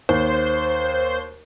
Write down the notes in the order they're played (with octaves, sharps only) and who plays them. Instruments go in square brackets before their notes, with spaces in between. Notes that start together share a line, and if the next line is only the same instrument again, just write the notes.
[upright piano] D#2 [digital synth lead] C5